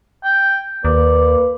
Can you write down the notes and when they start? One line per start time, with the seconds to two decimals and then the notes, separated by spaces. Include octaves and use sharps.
0.25 G5
0.85 D#2 A#3 B4 D5